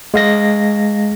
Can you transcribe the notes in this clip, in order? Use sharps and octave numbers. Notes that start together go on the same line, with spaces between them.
G#3 F5 A#6